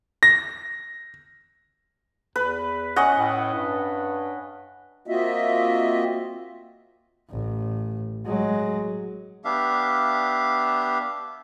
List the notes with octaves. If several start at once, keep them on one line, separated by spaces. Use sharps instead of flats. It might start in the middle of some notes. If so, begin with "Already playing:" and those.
A#6
E2 B4
C#4 D#5 F#5
A2
G2
A#3 C4 F4 F#4 D#5 E5
A1
F#3 G#3
B3 D4 G4 E5 F5